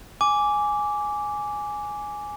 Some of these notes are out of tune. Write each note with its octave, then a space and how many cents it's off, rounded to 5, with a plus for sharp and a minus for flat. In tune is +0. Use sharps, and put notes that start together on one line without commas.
G#5 +0 D6 -10